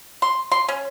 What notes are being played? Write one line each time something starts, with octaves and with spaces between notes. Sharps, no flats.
C6
C6
C#4